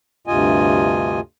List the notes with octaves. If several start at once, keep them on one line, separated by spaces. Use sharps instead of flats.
D2 G2 C3 F4 D#5 G#5